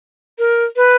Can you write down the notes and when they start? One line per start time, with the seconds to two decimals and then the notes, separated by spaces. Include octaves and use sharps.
0.39 A#4
0.76 B4